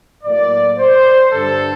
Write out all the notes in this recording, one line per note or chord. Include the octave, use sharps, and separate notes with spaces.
A2 F#3 A#3 D5
C5
G2 D3 G3 A4